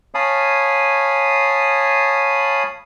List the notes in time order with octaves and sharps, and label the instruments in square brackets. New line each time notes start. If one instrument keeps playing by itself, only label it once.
[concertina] C#5 F5 G#5 A5 B5 D#6